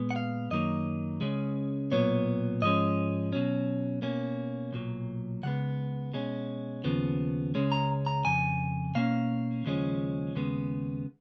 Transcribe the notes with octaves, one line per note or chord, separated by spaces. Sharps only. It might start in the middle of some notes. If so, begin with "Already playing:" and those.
Already playing: A#2 G#3 B3
F#5
F5
F#2 D#3 F#3 A#3 D#5
C#2 C#3 G#3 C#4
B1 A#2 F#3 B3 C#5
G#2 F3 G#3 C#4 D#5
B2 F#3 C#4
B2 A#3 C#4
B1 A#2 F#3
C#2 C#3 G#3 B3 F#5
B2 G#3 C#4
D#2 C#3 F3 B3
C#2 C#3 G#3 C#4
A#5
A#5
F2 C#3 G#5
B2 A#3 C#4 F5
D#2 C#3 F3 G#3 C#4
D#2 C#3 G#3 B3